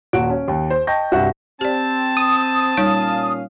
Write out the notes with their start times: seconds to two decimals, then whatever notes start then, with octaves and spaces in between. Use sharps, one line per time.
0.13 D#1 A#2 F#4 D7
0.30 C#4
0.48 D#2
0.70 C5
0.87 D#5 G5 A5 C#6 G6 A#6
1.12 C2 G2 F#4 E5
1.61 C4 G4 D5 A5
2.17 D#6
2.77 A#2 G3 C#4 D#4 C#5 F5